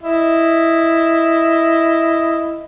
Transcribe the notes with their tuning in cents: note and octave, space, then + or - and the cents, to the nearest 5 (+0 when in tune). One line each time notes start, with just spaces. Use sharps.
E4 +0 D#5 +0